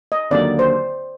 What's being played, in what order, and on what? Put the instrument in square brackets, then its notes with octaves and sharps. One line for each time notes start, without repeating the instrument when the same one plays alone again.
[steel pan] D#5
[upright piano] D#2 D3 F#3 A#3 [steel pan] D5
[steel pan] C5